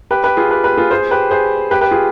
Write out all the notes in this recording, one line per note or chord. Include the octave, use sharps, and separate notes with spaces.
G4 B4
G4 B4
F4 G#4
G4 B4
G4 B4
F4 G#4
G#4 C5
G4 B4
G#4 C5
G4 B4
G4 B4
F4 G#4